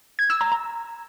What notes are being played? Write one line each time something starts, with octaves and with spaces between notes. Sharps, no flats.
G#6
E6
A#5
A#5